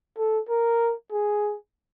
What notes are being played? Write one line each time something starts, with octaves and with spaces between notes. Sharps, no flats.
A4
A#4
G#4